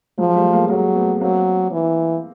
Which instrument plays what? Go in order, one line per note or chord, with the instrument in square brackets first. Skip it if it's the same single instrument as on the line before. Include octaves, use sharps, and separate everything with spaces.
[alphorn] F3 [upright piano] F#3 G#3
[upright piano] G3 A3
G#3 A#3
[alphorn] F#3 [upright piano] G#3 A#3
[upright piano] A3 B3
[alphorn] F#3 [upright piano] A#3 C4
[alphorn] E3